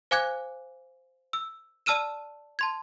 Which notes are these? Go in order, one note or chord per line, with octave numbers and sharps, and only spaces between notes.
C5 F5 G#5 D6 F#6 G#6
E6
D5 A5 E6 F6 D#7 E7
A5 C6 G#6